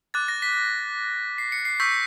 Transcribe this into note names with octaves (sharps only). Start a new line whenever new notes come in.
D6 F#6 A6
A#6
B6
C7
C#7
C7
C#6 E6 G6 B6